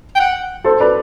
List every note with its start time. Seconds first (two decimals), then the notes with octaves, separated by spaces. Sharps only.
0.16 G5
0.20 F#5
0.64 A4 C5
0.80 B4 D5